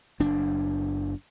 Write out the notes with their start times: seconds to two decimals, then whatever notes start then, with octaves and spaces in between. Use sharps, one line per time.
0.20 F#1 D4